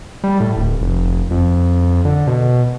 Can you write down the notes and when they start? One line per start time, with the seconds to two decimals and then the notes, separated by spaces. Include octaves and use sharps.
0.24 G3
0.40 A2
0.57 D1
0.81 F1
1.31 F2
2.05 D3
2.27 B2